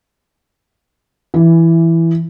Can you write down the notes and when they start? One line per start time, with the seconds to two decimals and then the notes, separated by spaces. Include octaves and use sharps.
1.34 E3